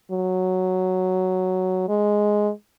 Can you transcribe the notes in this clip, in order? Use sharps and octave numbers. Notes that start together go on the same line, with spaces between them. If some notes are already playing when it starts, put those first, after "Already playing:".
F#3
G#3